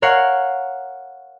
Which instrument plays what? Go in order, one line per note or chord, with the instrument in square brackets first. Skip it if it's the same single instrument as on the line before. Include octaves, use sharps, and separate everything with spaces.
[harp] A#4 C#5 F5 F#5